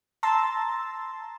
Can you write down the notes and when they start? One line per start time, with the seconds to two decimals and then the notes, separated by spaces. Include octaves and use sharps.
0.23 A5 A#5 C6 E6 A6